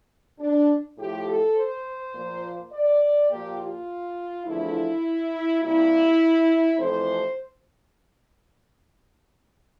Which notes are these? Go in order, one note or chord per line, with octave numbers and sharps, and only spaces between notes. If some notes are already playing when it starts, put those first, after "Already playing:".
D4
A2 F3 A3 G4
A4
C5
A#2 F3 A#3
D5
A#2 F3 A#3 G4
F4
E2 D3 F3 A3 E4
C3 G3 A#3 E4
F2 C3 E3 A3 C4 C5